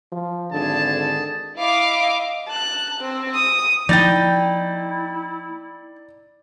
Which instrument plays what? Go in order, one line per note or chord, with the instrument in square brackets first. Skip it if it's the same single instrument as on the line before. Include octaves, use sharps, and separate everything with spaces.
[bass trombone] F3
[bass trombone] G#1 [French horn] D3 [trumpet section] G#4 A5
[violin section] E4 D#5 F5 D6
[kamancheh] A5 F#6
C4
D#6
[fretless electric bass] F3 A#3 [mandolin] D#4 G5 [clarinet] E4 [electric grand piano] D5 A6